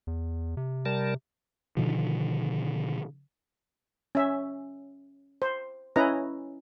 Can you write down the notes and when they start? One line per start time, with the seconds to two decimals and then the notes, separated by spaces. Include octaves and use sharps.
0.07 E2
0.57 C3
0.85 G3 A#4 A5
1.77 B2 D3 D#3 F3
4.15 C#4 E5
5.42 C5
5.96 C#4 E4 B4 D#5 A#5